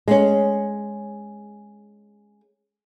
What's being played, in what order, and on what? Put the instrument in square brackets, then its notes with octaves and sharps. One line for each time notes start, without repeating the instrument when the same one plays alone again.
[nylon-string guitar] G#3 C#4